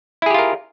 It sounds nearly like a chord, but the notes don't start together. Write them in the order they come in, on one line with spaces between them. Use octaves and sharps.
E4 G#4 G4 F4 A#4